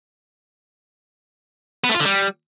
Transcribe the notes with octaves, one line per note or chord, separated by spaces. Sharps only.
B3
A3
F4
D3
G3